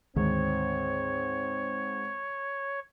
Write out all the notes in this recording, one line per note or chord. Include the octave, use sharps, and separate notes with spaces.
D2 G#2 D#3 C4 C#5